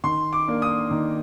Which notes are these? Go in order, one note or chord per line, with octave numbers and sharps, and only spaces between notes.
D#3 C6
D6
A#3 D4
D#6
D#3